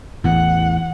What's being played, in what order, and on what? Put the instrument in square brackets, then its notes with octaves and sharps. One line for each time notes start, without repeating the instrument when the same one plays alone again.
[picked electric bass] A1 E2 [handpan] E3 [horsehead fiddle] F#5